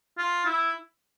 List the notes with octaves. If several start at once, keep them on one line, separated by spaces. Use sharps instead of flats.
F4
E4